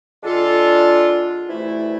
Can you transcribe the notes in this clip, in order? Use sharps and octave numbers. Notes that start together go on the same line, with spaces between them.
D3 G#3 D4 F4 A4
D2 C3 E3 A3 E4